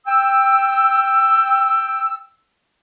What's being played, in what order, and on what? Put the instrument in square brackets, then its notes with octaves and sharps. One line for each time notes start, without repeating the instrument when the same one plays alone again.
[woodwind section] G5 E6